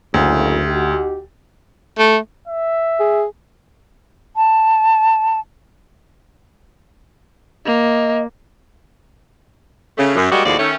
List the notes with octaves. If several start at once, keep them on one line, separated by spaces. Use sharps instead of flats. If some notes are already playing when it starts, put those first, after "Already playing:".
F#1 D2
D#4 F#4 G4
A3
E5
G#4
A5
A#3 D#5
C#3 A3
F#2
G3 G#3 A#3 F#4 D5 D#5
D#2 A2 F3 G#3 F#4 D5
D#3 A3 C#4